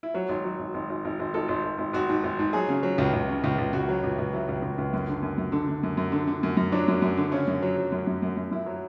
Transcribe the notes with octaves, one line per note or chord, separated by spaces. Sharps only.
E4
F#3 F#4
G#1
F#3
G#1
G#1
G#1
G#1
G#1
G#1 A4
G#1
G#1
G#1
G#1 F#4
G#2
G#1
G#2
F#3 G#4
C#3
F#3
C#2
C#2
C#3
C#2
C#2
C#2 F#4
F#3
C#2
C#2
F#3 E4
C#2
C#2
C#2
F#2
D3
F#2
F#2
D3
D3
F#2
F#2
D3
D3
F#2
F#2
F#3 D4
F#2
F#2
D3
C#3 C#4
F#2
F#3
F#3
F#2
F#2
F#2
F#2
F#2 E4
F#3